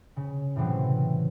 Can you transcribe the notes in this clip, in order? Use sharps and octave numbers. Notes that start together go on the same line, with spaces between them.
C#3
A2 C3 E3 F#3 C4